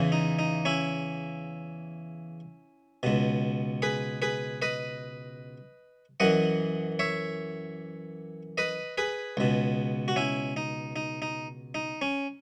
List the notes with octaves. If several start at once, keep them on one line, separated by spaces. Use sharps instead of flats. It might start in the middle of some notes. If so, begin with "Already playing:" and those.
Already playing: E2 C#3 E3
D#4
D#4
C#4 E4
C#2 B2
G#4 B4
G#4 B4
B4 D#5
F#2 E3 D#5 F#5
C#5 E5
B4 D#5
G#4 B4
C#2 B2
F#4
C#4 E4
D#4
D#4
D#4
D#4
C#4